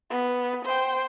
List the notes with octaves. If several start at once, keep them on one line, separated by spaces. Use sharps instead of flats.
B3
C5 G5